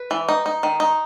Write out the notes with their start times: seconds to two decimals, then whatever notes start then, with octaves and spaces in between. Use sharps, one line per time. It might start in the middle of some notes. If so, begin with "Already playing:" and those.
Already playing: B4
0.11 E3
0.29 D#4
0.46 D#4
0.63 D#3
0.80 D#4